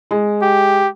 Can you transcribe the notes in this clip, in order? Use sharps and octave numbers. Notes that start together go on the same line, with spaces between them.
G#3
G4